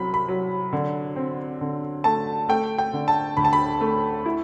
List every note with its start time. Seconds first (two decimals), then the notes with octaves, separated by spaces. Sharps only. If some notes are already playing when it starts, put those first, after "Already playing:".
Already playing: C2 F#3 C4 B5
0.14 B5
0.28 F#3
0.73 D3
1.16 C4
1.61 D3
2.04 A3 A5
2.49 A3 G5
2.78 G5
2.93 D3
3.08 A5
3.37 D2 B5
3.45 A5
3.53 B5
3.81 A3
4.26 E4